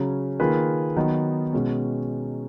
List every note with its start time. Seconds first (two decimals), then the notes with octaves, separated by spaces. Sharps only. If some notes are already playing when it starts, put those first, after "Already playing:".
Already playing: C#3 F#3 C#4
0.40 D#3 A#3 F4 G#4 B4
0.96 D#3 F#3 B3 D#4
1.53 B2 G#3 C#4